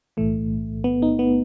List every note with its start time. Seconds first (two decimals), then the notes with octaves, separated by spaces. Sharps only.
0.17 B1 A2 E3 A3
0.84 B3
1.02 D#4
1.19 B3